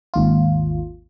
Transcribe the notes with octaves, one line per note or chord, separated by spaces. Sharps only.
G#1 D#2 F4